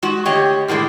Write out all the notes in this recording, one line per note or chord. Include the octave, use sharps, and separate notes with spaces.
G#3 F#4
D3 A3 G4 C#5 D#5
F#2 A2 D3 G#3